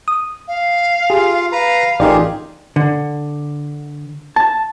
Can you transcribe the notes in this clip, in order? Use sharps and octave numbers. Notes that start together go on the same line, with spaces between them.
D#6
F5
F4 G4 G#4
B4 F5 A#5
A1 D#4 F4 G4 G#4 A#4 D5
D3
A5